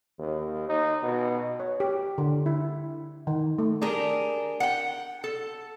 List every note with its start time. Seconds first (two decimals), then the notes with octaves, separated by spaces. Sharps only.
0.19 D#2
0.69 D#4
1.03 B2
1.60 C#5
1.80 G4
2.18 D3
2.46 E4
3.27 D#3
3.59 A3
3.82 D4 G4 G#4 A#4
4.60 F#5 G5
5.24 A4